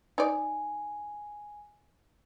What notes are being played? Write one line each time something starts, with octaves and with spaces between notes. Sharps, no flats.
D#4 D5 G#5